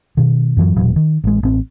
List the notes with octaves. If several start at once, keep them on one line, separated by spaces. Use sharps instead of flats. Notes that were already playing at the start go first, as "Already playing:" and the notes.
B2 D#3
F#2 E3 F#3
E1 A#2 F#3
D#3
A1 G#3
A1 C4